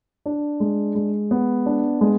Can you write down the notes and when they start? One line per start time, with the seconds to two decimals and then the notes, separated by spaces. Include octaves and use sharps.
0.26 D4
0.60 G#3
0.95 G#3
1.31 B3
1.66 D4
2.01 G#3